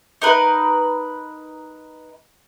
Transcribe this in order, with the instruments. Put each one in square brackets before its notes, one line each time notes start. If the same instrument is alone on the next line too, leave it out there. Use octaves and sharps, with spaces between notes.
[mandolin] D#4 A#4 B4